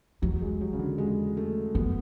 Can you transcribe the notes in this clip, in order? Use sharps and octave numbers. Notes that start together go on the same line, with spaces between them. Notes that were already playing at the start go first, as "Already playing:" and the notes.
E2 F#3
G#3
F#3
C#3
D3
G#3
A3
F#2 B3